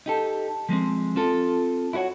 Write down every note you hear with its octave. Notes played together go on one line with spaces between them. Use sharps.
D#4 G4 A4
F3 G#3 A#3 C4
C4 F4 A4
E4 F#4 B4 C#5 F#5